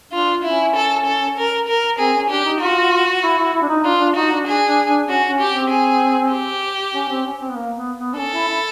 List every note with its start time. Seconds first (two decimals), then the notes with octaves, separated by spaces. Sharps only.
0.12 D4 F4
0.43 C#4 E4
0.75 A4
1.05 A4
1.37 A#4
1.67 A#4
1.98 C4 G#4
2.14 C#4
2.29 D4 G4
2.45 D#4
2.60 F4 F#4
3.23 E4
3.38 E4
3.54 E4
3.62 D4
3.69 D#4
3.84 D4 F4
4.00 D4
4.15 D#4 F#4
4.31 D4
4.46 D4 G#4
4.67 D4
4.88 D4
5.08 C#4 F#4
5.29 C#4
5.39 G4
5.50 C4
5.70 G#4
6.31 G4
6.94 C#4
7.09 C4
7.25 C#4
7.41 C4
7.49 B3
7.56 A#3
7.77 B3
7.97 B3
8.14 D4
8.18 C#4 A4
8.34 E4
8.48 E4